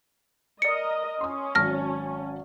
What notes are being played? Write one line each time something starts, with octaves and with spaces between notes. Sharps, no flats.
A#4 D5 D#5 C#7
C#4 C6 D#6
G#1 F#3 A5 F6 A#6